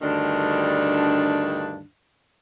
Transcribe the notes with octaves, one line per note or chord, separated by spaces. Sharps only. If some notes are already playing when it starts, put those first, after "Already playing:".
D2 G2 D#3 D4